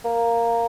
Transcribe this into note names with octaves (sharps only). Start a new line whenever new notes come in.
A#3